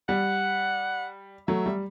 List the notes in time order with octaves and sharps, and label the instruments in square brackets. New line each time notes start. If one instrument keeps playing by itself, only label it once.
[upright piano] G3 [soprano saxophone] F#5
[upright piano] F#3 A3 [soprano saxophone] E5
[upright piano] G3